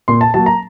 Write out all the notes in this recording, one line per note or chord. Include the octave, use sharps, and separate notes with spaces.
A#2 C6
A5
F#3 A#3 A5
A#5